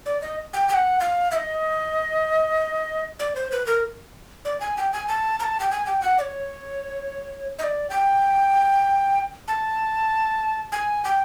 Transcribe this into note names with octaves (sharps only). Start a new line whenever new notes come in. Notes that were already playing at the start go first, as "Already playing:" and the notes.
D5
D#5
G5
G5
F#5
F5
E5
D#5
D5
C5
B4
A#4
D5
G#5
G5
G#5
A5
A#5
A5
G5
G#5
G5
F#5
D5
C#5
D#5
D5
G5
A5
G#5
G5